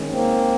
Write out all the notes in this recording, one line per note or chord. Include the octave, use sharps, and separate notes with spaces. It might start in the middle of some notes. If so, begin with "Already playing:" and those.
Already playing: D#3 G#3 C#4
A#3 C4